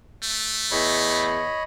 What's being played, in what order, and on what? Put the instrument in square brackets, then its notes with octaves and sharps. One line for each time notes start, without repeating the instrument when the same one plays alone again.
[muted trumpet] A3
[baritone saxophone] E2 [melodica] C#5 D#5 B5